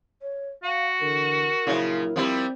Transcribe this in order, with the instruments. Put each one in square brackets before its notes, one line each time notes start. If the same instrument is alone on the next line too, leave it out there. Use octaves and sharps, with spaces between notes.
[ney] C#5
[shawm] F#4 [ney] F5
[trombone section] D3 E3 [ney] A#4
[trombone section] A#1 F#3 E4 [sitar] C#3 F3
[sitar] F3 G3 E4 [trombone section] C4